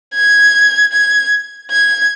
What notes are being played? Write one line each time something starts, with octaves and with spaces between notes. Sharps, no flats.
G#6
G#6
G#6